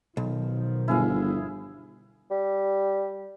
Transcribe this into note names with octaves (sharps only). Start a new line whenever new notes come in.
B1 B2 D#3 F3
G1 E4 G#4 F5
G3